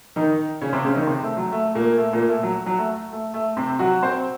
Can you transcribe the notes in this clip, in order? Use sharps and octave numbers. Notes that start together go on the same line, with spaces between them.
D#3 D#4
C#3 C#4
C3 C4
C#3 C#4
D#3 D#4
C3 C4
A3
F#3
A3
A#2 A#3
A3
A#2 A#3
A3
F#3
F#3
A3
A3
A3
C3 C4
F#3 F#4
C4 C5